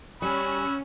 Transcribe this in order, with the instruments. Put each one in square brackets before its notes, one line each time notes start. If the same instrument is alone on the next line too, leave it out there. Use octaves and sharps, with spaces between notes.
[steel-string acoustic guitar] G3 [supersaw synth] C#4 [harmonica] F#4 E6 [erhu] B5